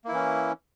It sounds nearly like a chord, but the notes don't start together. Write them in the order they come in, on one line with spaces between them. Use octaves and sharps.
A#3 E4 E3 C#4